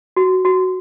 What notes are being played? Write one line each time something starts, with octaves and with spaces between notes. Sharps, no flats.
F#4
F#4